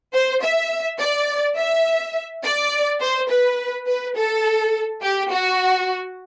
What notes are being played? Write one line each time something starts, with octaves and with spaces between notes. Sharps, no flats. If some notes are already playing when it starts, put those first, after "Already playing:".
C5
E5
D5
E5
D5
C5
B4
B4
A4
G4
F#4